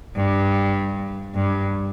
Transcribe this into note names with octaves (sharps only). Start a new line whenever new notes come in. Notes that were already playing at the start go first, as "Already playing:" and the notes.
G2
G2